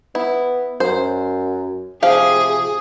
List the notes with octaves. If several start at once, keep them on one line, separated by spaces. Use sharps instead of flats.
B3 E4
F#2 C5
C3 F3 G4 G#4 F5